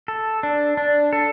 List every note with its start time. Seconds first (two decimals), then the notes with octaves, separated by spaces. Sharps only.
0.08 A4
0.43 D4
0.77 D4
1.13 A4